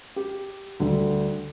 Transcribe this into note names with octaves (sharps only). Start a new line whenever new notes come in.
G4
D2 D3 G3